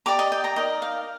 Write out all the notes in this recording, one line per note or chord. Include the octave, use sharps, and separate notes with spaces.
G4 D5 A#5 D6
D#5
D#5 G5
G5 A#5
D#4 A#4 D5 D#5
F5